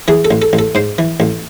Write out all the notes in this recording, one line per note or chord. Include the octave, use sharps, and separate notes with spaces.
E3 G#4
A4
A1
A4
A1
A4
G#2 C5
E3
A1